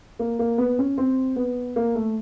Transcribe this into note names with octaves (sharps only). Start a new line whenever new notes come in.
A#3
A#3
B3
C#4
C4
B3
A#3
A3